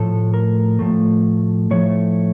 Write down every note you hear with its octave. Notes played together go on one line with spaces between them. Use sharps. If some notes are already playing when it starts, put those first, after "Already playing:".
Already playing: A2 F3 A3 A4
A#4
A2 F3 A3
A2 F3 A3 C#5